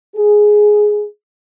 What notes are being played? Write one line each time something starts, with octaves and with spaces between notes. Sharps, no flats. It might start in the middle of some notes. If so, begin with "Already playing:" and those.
G#4